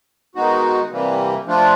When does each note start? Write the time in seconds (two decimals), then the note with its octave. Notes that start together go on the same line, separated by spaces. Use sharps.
0.35 D#3 G#3 B3 D#4 F#4
0.90 C3 E3 G3 A#3
1.46 F3 A3 D4 F4